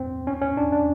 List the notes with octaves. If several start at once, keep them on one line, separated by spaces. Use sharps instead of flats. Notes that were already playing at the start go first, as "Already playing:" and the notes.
Already playing: C4
C#4
C#4
D4
D4